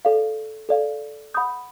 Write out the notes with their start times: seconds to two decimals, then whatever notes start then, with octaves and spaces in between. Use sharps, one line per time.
0.05 A4 D5 F5
0.69 A4 D5 F5
1.34 F#5 B5 D#6 G6